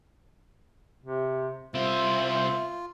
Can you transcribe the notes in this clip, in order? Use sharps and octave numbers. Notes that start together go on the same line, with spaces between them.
C3
C2 C4 F4 C5 E5